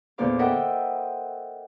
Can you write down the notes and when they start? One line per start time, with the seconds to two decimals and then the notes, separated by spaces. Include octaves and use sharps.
0.18 E2 A#2 D3 C5 F5 D6
0.39 A4 A#4 D#5 E5 F#5 G5